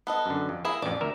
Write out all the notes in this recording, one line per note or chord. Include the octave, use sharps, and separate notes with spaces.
B3 A4 D#5
F#2 D3
F2
A#3 E4 G#4 E5
A1 F2 D5
D2 A#4 E5